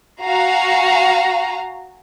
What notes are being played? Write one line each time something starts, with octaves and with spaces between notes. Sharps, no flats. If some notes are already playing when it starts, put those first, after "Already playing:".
F#4 F5 G#5 A#5